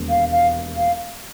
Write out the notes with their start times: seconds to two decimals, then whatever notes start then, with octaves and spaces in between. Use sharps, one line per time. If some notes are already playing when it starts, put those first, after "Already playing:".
Already playing: E1 D#2 G#3
0.09 F5
0.32 F5
0.76 F5